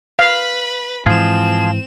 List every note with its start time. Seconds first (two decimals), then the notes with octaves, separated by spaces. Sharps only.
0.19 B4 F5 B5
1.06 G#2 E3 F3 C4 F4 G#4 E7